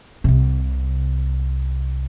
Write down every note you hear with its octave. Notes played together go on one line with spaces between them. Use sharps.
C2 C3